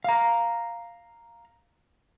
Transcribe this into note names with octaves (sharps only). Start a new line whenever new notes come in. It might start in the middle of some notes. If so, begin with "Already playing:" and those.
F5 A#5